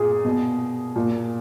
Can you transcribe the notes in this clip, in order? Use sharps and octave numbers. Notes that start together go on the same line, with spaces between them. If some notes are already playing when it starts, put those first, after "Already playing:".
Already playing: A#2 G#4
B2
A#2